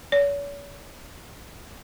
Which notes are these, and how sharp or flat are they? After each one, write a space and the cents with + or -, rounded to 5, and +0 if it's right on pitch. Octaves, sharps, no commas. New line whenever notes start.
C#5 +40